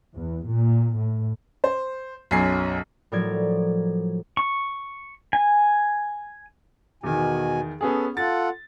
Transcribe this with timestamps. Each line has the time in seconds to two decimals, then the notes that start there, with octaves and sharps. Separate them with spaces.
0.14 E2
0.47 A#2
0.96 A2
1.64 C5
2.31 B1 F#2 G#5 C7
3.12 A2 F3 F#3 A#4 D5 G#6
4.37 C#6
5.33 G#5
7.03 E2 B2 D#3 G#5
7.81 B3 C#4 G#4 A4
8.17 F4 A4 F#5 A6